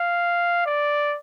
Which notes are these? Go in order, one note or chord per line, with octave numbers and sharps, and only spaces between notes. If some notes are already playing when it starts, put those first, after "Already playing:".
Already playing: F5
D5